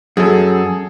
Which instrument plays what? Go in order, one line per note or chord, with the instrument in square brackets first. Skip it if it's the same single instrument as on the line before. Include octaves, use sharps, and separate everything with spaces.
[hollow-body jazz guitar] F#2 [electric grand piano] G#4 A4